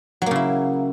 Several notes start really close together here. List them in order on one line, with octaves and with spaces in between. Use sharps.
F#3 A#3 C#3 E4